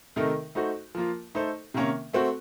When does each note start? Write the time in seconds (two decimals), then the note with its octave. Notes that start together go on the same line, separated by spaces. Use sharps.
0.16 C3 D#3 A3 D#4 A#4
0.55 A3 D#4 F#4 C5
0.95 F3 A#3 F4
1.35 A3 D#4 A4 C5
1.74 C3 D#3 A#3 C#4
2.13 A3 C4 F#4